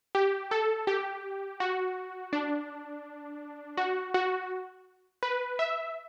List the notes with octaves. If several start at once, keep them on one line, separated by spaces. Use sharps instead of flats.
G4
A4
G4
F#4
D4
F#4
F#4
B4
E5